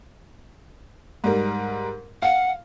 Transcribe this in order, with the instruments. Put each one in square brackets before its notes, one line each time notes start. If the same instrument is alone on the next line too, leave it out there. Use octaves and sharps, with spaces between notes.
[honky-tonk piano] G#2 G3 A#4
[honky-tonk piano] F5 [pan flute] F#5